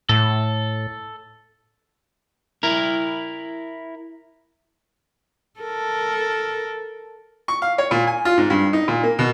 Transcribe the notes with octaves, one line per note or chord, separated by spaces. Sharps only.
A2 A4
E4 A#4
A4 A#4
C#6
F5
C#5
A#2
G#5
F4
G#2
G2
D#4
A#2
A#3
B2